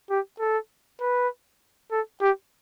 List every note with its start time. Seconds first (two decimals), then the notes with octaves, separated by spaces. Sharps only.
0.10 G4
0.40 A4
1.01 B4
1.92 A4
2.21 G4